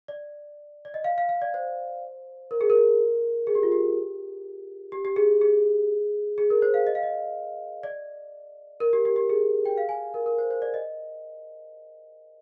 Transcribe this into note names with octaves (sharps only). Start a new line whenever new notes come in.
D5
D5
D#5
F5
F5
F5
D5
C5
A#4
G#4
A#4
G#4
G4
F4
G4
G4
G4
G#4
G#4
G#4
A#4
C5
F5
D#5
F5
D#5
D5
A#4
G4
G4
G4
G#4
G5
F5
G#5
A#4
A#4
C5
C5
D5
D#5